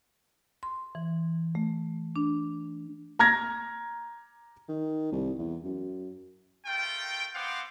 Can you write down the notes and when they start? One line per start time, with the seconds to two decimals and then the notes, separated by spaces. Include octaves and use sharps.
0.63 C6
0.95 E3
1.55 A3
2.16 D4
3.19 A#5 F6 G#6 A#6
4.69 D#3
5.12 C2
5.38 E2
5.64 F#2
6.66 A3 F4 A#4 G5
7.35 B3 C4 C5 F5 F#5 D6